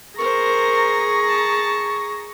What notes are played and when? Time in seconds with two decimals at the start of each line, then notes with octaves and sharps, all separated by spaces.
0.18 G#4 A#4 C5 A#5 C#6
1.28 A5